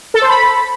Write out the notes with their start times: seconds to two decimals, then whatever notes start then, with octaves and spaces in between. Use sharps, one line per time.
0.14 A4
0.22 C5
0.29 B5